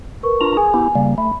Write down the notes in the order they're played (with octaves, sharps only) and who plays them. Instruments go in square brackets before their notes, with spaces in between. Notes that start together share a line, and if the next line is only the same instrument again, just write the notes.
[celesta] A#4 B4 C#6
[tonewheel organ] D4 F4 A#5
[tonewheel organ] G#4 [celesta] G#5
[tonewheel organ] B3 E4 G4
C#3 G3 A#3
[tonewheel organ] A3 [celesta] B5